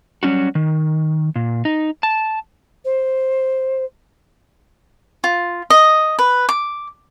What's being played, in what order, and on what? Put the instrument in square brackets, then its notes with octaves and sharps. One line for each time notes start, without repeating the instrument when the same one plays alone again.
[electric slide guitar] F#3 G3 C#4 D#4 F#4
D#3
A#2
D#4
A5
[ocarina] C5
[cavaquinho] F4
D#5
B4
D6